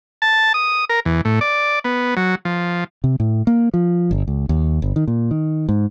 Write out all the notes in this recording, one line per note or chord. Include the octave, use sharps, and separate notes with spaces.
A5
D#6
A#4
E2
A2
D5
B3
F#3
F3
C3
A2
A#3
F3
G1
C#2
D#2
G1
D#3
A#2
D#3
G#2